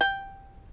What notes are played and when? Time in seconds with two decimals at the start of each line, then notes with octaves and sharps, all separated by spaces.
0.01 G5